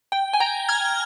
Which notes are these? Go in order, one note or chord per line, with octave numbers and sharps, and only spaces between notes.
G5
G#5
G5 A#5
F6 G#6